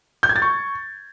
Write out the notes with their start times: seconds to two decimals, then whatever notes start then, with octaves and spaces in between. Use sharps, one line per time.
0.23 G6
0.29 G#6
0.36 A6
0.42 C#6